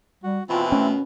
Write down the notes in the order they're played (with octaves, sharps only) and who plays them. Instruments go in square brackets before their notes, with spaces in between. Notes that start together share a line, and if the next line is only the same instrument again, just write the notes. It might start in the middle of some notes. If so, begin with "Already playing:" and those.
[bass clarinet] G3 [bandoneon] F#4
[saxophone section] D#2 B2 [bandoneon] E3 C4 E4 [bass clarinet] F4
[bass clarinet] A3 [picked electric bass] C#4